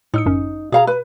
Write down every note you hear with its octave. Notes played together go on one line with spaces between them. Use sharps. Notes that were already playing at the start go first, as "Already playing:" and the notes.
A2 D#4 E6 C#7
G1 F#2 C#4
B2 G#4 F5 A#5
B4